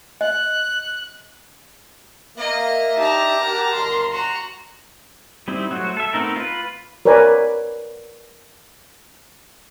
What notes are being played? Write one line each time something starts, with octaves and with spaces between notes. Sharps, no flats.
D#5 F#6
A#3 D#5 E5
D4 D#4 G4 A5 A#5
A#4 F#5
G1 D#2 D4 C6
F#4 A#5
G3 C4 D#4 E4
F#3 A3 F#4 C5
A4 E5
A3 B3 C4 D#4 A#4
F4 B4
A#4 B4 C#5 D5 G#5